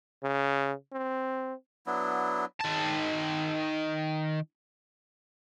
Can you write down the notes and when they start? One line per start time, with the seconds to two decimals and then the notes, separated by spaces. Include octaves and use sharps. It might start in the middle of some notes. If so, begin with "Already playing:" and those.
0.23 C#3
0.92 C4
1.87 F#3 B3 D4 E4
2.61 D#3 A5